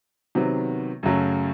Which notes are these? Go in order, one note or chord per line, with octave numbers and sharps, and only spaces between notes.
C3 D#3 F#3 B3
F#2 C#3 F#3 A3